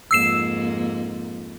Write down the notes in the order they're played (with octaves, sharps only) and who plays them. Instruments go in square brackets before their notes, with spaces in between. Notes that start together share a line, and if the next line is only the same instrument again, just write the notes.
[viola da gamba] F2 G#2 A#3 [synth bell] E6 C7 E7